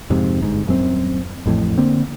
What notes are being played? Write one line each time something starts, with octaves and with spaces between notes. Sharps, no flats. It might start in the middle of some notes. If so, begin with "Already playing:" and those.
F2 G#2 C3
G1 G#2
D#1 F#2 C4
A1 F2 A2
D3 A#3 C4